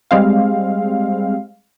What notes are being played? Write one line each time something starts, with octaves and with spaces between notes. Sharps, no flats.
G3 G#3 C4 F5